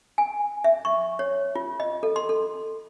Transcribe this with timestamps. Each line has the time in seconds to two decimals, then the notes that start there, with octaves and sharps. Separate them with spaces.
0.18 G#5
0.64 E5
0.85 C#6
1.19 C#5
1.55 F4
1.80 D#5
2.03 A4
2.16 C6
2.29 A4